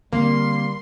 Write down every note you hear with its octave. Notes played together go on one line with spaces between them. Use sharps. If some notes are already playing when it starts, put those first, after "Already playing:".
D3 G3 A#3 C4 C6